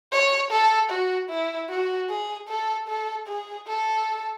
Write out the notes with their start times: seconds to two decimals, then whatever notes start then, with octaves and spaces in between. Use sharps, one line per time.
0.13 C#5
0.51 A4
0.90 F#4
1.30 E4
1.70 F#4
2.09 G#4
2.49 A4
2.88 A4
3.27 G#4
3.67 A4